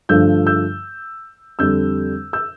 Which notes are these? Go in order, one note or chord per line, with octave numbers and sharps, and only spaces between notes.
G2 D3 F3 A3 E6 G6
E6 G6
F2 D3 G3 E6 G6
E6 G6